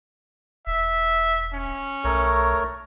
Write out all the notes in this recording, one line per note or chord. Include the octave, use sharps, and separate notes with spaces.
E1 E5
C#4
B1 A3 A#4 C#5